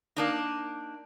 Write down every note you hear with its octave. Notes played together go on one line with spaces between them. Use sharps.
A#3 D4 D#4